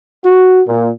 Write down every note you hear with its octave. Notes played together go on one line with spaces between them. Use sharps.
F#4
A#2